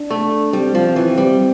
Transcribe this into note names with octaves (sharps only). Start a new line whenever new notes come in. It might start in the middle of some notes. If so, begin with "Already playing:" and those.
Already playing: D4
A3
G3 C4
F3
E3
G3